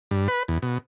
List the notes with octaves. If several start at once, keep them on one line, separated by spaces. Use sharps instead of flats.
G2
B4
E2
B2